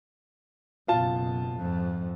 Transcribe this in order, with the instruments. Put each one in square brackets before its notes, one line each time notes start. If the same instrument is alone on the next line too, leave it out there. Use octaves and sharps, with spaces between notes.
[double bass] F#1 B2 [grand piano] F4 A5
[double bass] F2 G#2